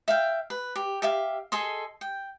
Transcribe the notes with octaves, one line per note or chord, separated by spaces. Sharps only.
E5 F5 G5
B4
G4
G4 E5 F5
G#4 A4 D#5 C6
G5